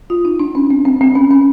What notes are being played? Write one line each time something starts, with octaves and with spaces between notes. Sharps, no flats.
F4
D#4
D4
C#4
C4
C4
C4
C#4
C#4